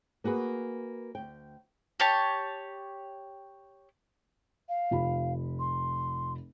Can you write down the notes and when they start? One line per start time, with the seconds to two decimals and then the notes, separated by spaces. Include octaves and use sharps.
0.24 A#3 F#4 G#4 B4
1.15 D2 G5
2.00 G4 C#5 A5
4.69 F5
4.91 F1 F4 B5
5.59 C6